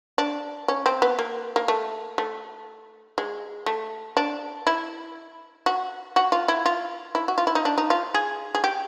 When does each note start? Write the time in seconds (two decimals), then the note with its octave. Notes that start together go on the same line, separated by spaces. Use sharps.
0.18 D4
0.68 C#4
0.86 C4
1.02 B3
1.19 A#3
1.56 A#3
1.68 A3
2.18 A3
3.18 G#3
3.66 A3
4.17 D4
4.67 E4
5.66 F#4
6.16 F#4
6.32 F4
6.48 E4
6.66 F4
7.15 E4
7.28 F#4
7.38 F4
7.47 E4
7.55 D#4
7.65 D4
7.78 D#4
7.90 F4
8.14 G#4
8.55 G#4
8.64 G4